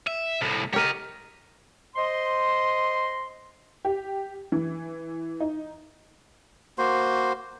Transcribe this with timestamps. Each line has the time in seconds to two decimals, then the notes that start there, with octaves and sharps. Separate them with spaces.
0.07 E5
0.41 C2 A2
0.73 G4 A#4 C#5 D#5
1.96 C5 D#5 C6
3.85 G4
4.52 E3
5.40 D#4
6.78 A#3 F#4 C5 C6